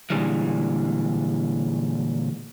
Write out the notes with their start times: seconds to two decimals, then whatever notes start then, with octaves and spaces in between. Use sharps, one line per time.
0.10 A#2 D3 E3 G3 G#3